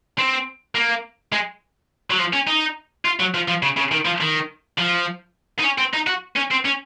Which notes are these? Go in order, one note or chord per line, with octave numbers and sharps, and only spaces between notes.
C4
A#3
G#3
F#3
F3
C#4
D#4
F4
F#3
F3
F3
C#3
C#3
D#3
F3
D#3
F3
D#4
C#4
C4
D#4
F#4
C#4
C4
C#4